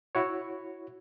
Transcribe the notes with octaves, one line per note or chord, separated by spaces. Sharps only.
E4 F#4 C#5